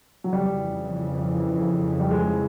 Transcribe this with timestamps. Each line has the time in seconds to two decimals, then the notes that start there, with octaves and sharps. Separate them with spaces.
0.24 F#3
0.32 F2 C#3 E3 G3
2.00 G3
2.11 G#3